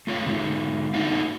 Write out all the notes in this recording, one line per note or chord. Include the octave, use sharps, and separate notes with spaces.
A3 F4 C#5 F5
D3 G#3 D#4
A3 A#3 D4 D#4 F#4 F5